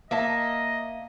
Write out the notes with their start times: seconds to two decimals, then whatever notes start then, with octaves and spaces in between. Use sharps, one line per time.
0.11 A#3 D#5 E5 A5